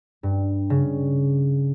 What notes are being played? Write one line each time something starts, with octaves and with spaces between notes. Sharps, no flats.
G2
C#3